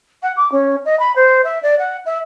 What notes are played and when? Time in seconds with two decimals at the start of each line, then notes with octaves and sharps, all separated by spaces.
0.22 F#5
0.36 D6
0.52 C#4
0.85 D#5
0.99 B5
1.15 C5
1.44 E5
1.62 D5
1.79 F#5
2.05 E5